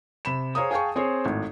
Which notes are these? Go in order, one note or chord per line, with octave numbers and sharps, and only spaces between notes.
C3 B5 E7
G#4 C5 C#5 F5 A#5 D#6
G#4 F5 G5 A5 C#6
C4 G#4 C5 C#5
G#1 A2